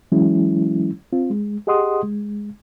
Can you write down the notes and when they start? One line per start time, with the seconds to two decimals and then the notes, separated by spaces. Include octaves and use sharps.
0.12 E3 F#3 G#3 C#4 E4
1.13 C4 F4
1.30 G#3
1.67 G4 G#4 D#5 F#5 C6 D#6
2.03 G#3